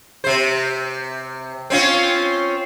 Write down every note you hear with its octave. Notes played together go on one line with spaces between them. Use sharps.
C3 C5
C4 C#4 F4